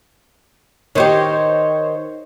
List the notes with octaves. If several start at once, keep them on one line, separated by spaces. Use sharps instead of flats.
D#3 D#4 G4 C5 C#5